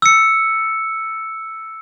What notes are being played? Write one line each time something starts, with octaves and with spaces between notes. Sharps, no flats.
E6 C#7